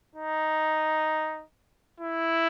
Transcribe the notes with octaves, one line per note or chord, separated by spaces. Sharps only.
D#4
E4